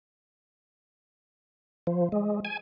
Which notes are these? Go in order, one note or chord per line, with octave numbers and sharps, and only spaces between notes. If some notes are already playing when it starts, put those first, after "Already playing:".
F3
G#3
G#5